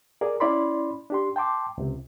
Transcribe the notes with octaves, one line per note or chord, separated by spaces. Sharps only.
G#4 A#4 D5
C#4 E4 D5 B5 C6
D4 G4 C6
G5 A5 C6 D6
C#2 C3